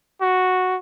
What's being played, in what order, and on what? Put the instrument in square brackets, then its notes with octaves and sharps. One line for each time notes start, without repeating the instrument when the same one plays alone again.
[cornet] F#4